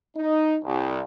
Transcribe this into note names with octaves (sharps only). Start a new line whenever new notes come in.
D#4
C2